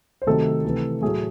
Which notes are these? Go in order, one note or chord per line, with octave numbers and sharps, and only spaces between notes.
C5
C3 D#3 F#3 A3 A4
C3 E3 A3
A2 F#3 A3 G#4